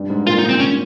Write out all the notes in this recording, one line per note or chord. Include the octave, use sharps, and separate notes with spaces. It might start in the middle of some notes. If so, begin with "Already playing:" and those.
Already playing: G2
G#2
A#2 F4
D#4
C4
C#4